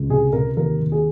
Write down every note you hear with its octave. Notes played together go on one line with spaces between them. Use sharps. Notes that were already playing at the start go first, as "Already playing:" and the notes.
Already playing: C#2
C3 G#4
C3 A#4
D#2 A#4
D#2
G#4